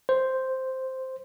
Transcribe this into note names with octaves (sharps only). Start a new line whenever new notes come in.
C5